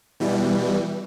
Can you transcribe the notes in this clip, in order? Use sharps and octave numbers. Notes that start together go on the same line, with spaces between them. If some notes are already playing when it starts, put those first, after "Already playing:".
B2 E3 G3